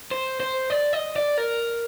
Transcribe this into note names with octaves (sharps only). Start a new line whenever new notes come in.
C5
C5
D5
D#5
D5
A#4